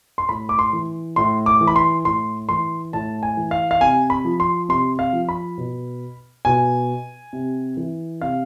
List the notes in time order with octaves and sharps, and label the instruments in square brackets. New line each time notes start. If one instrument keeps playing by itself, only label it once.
[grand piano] C6
A2 B5
D6
C6
E3
A2 C6
D6
E3
B5
C6
A2 C6
E3 C6
A2 A5
G#5
E3
F5
F5
C3 G#5
B5
F3
C6
C3 C6
F5
F3
B5
B2
B2 G#5
C3
E3
C3 F5